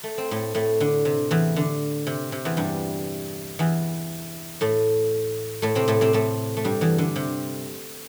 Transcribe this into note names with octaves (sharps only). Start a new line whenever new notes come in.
A3
C4
A2 A3
A2 A3
D3
C3
E2 E3
D3
C3
C3
E2 E3
G2 G3
E2 E3
A2 A3
A2 A3
C3 C4
A2 A3
C3 C4
A2 A3
A3
G2 G3
E2 E3
D3
C3